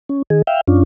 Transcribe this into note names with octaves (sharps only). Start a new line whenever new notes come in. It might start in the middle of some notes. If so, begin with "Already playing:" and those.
C#4
D#3 G#4
E5 F5 G5
F#2 C#4 D4 F4